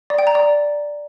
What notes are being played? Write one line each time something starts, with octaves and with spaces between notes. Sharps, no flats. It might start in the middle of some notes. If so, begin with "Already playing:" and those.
D5
G5
A#5
D5